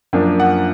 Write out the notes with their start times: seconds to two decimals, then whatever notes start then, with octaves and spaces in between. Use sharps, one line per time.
0.13 F#2 F3 A#3 D4
0.40 F#5